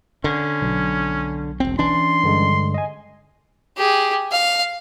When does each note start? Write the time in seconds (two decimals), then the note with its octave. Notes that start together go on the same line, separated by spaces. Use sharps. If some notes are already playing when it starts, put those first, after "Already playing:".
0.24 D3 C#4
0.62 B1
1.60 E1 C4
1.79 E3 C#4 D4 C6
2.23 G2 D3 G#3
2.74 D#5 G#5
3.77 G4 G#4
4.31 F5